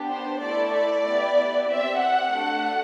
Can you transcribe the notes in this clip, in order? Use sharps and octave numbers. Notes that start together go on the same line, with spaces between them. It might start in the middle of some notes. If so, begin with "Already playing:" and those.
Already playing: B3 D4 G4
C5
A3 E4 A4 D5
D5
B3 E4 G4
C4 G4 E5
F#5
A3 D4 F#4 A4